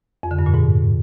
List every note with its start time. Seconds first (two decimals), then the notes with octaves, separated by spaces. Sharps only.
0.23 F2
0.31 D3
0.39 G2
0.46 A#2
0.54 G#2